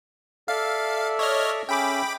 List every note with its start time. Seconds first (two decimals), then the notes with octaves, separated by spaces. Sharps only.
0.48 A4 D5 E5 F5
1.19 C#5 D#5 F6
1.69 C#4 G#4 E5 G5 B5 D6